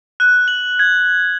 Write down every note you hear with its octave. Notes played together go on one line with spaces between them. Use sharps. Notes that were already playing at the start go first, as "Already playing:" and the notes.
F#6
F#7
G#6